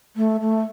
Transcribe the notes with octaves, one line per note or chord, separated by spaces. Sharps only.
A3
A3